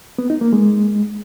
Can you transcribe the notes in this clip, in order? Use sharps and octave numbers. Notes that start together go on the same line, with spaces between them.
B3
D#4
A#3
G#3